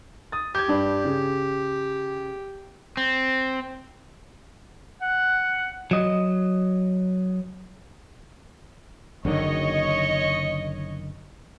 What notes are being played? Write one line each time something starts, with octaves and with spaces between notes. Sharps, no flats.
D#6 A6
G4 G6 G#6
G2 D4 B4
C#3
C4
F#5
F#3 D#5
F#1 D3 D#3 C#5 D#5 C#6